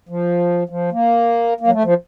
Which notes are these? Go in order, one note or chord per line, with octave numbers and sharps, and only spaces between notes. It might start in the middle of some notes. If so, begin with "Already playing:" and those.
F3
F3
A#3
A#3
F#3
A3
F3